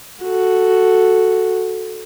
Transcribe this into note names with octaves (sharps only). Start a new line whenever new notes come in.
F#4 A4